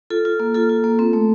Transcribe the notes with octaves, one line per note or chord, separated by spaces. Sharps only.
F4 A4
F4
A#3
F4 A4
F4
A#3
C4
A3